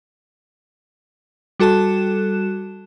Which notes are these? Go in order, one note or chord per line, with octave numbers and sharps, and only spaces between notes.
G3 F#4 A4 A5 F#6 E7